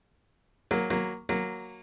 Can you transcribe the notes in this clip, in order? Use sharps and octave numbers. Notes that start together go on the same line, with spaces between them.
F#3 A#3
F#3 A#3
F#3 A#3